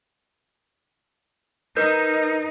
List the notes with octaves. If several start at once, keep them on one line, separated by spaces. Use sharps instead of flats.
D#4 A#4 B4 G6